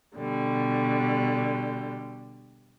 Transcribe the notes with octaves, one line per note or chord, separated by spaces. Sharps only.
B2 D3 G3